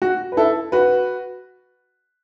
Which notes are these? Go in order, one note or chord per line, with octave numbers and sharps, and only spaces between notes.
F#4
B4
E4 A4
F#4 B4